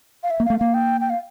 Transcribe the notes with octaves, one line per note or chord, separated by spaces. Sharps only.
F5
E5
A#3
F5
A3
A#3 F5
G5
G5
F5